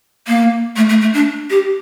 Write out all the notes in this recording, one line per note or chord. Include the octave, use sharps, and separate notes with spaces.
A#3
A3
A3
A3
D4
G4